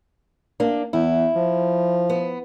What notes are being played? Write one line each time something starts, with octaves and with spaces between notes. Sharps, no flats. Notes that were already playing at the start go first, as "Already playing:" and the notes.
A#3 D4
E2 E4
F3
B3